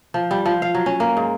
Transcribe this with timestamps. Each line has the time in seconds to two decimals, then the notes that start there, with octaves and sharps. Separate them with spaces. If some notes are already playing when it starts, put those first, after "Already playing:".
0.14 F3
0.31 G3
0.46 F3
0.62 F5
0.75 F#3
0.86 C#4
1.00 A#3
1.17 G#2